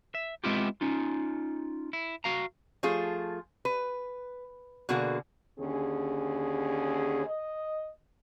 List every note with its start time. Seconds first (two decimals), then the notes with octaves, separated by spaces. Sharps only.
0.15 E5
0.44 G#3 B3 C4 E4 F4 G4
0.81 C#4 D#4 F4
1.93 E4
2.24 F#4 F5 A#5
2.83 F3 A3 F4 G#4
3.65 B4
4.89 B2 D3 A#3 F#4 G#4
5.60 D#2 D3 C#4 G#4
7.26 D#5